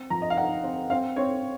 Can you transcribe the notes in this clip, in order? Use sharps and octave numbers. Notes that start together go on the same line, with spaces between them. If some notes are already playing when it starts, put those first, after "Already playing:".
Already playing: C4
F3 A#5
D#5
F5
D#4 F#5
C4
C4 F5
C4 C#5